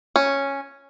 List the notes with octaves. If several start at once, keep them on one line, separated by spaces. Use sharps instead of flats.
C#4